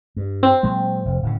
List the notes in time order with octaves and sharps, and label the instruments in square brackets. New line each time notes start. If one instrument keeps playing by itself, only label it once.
[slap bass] G2
[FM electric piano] C4
[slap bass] A#2 F#3 G#3
F1
D1 A2 C#3